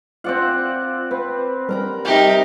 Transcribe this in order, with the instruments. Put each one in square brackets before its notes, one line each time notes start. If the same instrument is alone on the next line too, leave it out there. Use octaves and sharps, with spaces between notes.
[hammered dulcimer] C4 D5 F#5 [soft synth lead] F4
[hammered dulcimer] C4 [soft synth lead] B4
[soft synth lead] G3 [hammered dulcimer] A#4 A#5 B5
[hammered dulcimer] C3 G5 [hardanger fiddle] D#4 G4